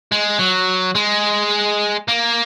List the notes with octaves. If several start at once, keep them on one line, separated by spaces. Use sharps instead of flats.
G#3
F#3
G#3
A#3